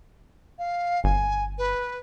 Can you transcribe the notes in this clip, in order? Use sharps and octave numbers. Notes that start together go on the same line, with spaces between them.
F5
G1 G#5
B4